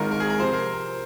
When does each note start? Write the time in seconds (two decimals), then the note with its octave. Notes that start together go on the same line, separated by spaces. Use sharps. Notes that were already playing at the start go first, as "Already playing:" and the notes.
Already playing: G#1 G#2 D#3 G#3 F4 A#4
0.11 A#4
0.20 G#4
0.30 A#4
0.39 C3 F3 C4 C5
0.54 A#4